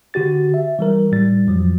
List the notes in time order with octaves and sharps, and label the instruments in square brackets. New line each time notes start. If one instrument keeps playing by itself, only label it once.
[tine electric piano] D3 F#4 G4 A6
E5
E3 G3 A#4
A2 G3 A6
F2 F3 F#3